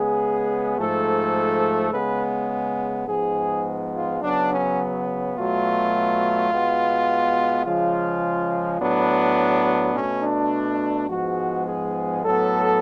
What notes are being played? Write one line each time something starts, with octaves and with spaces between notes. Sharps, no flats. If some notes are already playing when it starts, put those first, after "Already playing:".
Already playing: C#3 G#3 B3 G#4
G#2 F3 A3 A4
C#3 G#3 B3 B4
G#2 F3 G#3 B3 G#4
F4
C#3 F#3 B3 D4
C#4
B2 F#3 A3 F4
B2 G#3 B3
C#3 F3 G#3 F4
A2 F#3 B3 D4
B2 A3 C#4
D4
G#2 F3 G#3 B3 F#4
G#4
A2 F#3 B3 A4